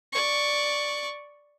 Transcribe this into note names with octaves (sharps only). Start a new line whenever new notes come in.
D5 C#6